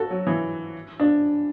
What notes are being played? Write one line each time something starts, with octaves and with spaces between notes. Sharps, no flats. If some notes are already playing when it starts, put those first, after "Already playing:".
Already playing: F#4 A4
F#3
E3
D4